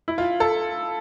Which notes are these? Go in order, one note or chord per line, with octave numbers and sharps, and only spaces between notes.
E4
F4
A4